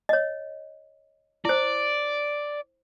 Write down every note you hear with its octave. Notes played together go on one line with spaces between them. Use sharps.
C#5 D#5
E4 C5 D5